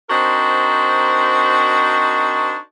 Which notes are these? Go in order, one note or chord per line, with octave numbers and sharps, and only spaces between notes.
C4 D4 D#4 F#4 A#4 C5